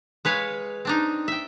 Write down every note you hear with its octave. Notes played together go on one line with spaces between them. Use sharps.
G#3 B4 C#5 F5
C4 D4 D#4
E5 G5